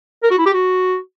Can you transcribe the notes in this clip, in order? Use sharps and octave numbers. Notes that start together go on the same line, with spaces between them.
A#4
F#4
E4
G4
F#4